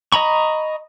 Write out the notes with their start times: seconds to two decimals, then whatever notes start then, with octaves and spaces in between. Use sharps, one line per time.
0.12 D#5 A#5 B5 C#6